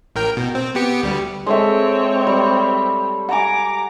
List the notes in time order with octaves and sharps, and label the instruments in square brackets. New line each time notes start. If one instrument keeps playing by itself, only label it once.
[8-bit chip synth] A1 A#4 G5
B2
C4
B3 G4 C#7
D2 G3
[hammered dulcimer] G#3 A4 E5 [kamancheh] C4 C#5
[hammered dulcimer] G3
[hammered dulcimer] F#5 G#5 [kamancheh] A#5 D6